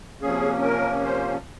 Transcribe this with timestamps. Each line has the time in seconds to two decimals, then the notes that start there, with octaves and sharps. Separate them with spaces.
0.22 C3 F3 A#3 C#4 G#4
0.63 A#4
1.04 C5